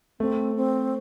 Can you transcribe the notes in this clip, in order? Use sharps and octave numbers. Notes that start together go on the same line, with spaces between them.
A3 C4
C4